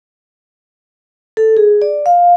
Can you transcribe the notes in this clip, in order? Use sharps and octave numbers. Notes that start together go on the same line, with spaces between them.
A4
G#4
D5
F5